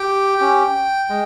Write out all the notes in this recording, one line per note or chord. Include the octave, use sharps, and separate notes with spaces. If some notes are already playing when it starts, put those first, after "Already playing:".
Already playing: G4 G5
C#4 G4
G#3